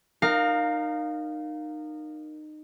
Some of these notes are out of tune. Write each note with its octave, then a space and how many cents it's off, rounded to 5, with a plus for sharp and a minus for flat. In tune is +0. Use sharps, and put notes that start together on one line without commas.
D#4 -25 A#4 +0 F5 +15